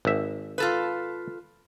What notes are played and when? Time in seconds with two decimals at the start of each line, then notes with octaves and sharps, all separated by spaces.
0.05 G#1 E5
0.58 F4 A4 B4